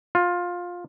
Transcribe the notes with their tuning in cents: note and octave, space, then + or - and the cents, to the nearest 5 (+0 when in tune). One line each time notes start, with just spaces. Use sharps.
F4 +15